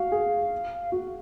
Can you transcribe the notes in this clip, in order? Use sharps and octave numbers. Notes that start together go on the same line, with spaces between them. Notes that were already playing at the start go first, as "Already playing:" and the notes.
Already playing: F#4 F5
G#4
F#4